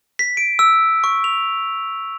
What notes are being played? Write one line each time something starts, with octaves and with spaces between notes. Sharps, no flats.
B6
D7
E6
C#6
F7